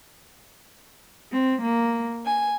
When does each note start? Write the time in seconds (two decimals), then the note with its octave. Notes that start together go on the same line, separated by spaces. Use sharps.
1.33 C4
1.63 A#3
2.25 G#5